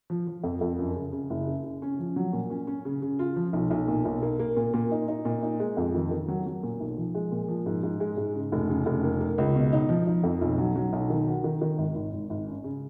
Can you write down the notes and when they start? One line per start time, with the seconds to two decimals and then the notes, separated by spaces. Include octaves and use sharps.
0.10 F3
0.27 F3
0.44 F2
0.61 F2
0.79 F#2
0.96 C#3
1.13 C#3
1.30 F#1
1.47 C#3
1.64 C#3
1.82 C#4
1.99 F3
2.16 F#3
2.33 A#2
2.50 C#4
2.67 C#4
2.85 C#3
3.02 C#3
3.19 F4
3.36 F3
3.53 B1
3.71 B1
3.88 A#2
4.05 B1
4.22 A#3
4.39 A#3
4.57 A#2
4.74 A#2
4.91 D#4
5.08 D#4
5.25 A#2
5.43 D#4
5.60 G#3
5.77 F2
5.95 D#3
6.11 D#3
6.28 F#3
6.46 F#3
6.63 A#2
6.80 B1
6.97 F3
7.15 G#3
7.32 A#2
7.48 F3
7.66 G#2
7.83 G#2
8.00 G#3
8.17 G#2
8.35 C#3
8.52 F1
8.70 C#3
8.86 F1
9.04 A#3
9.21 A#3
9.38 C#2
9.56 B2
9.73 D#4
9.89 F3
10.07 D#4
10.24 F2
10.41 B1
10.58 F#3
10.76 F#3
10.93 B1
11.10 D#3
11.27 F#4
11.44 D#3
11.62 D#3
11.78 G#1
11.95 G#1
12.13 G#1
12.30 G#1
12.47 C#4
12.64 C#3